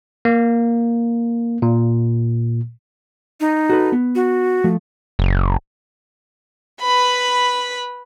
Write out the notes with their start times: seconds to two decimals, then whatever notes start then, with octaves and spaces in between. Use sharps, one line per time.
0.25 A#3
1.62 A#2
3.40 D#4
3.70 F#4 A4 B4
3.93 B3
4.15 F#4
4.64 F3 A3
5.19 F#1
6.81 B4 B5